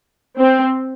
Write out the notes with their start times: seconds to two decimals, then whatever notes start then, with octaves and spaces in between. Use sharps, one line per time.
0.39 C4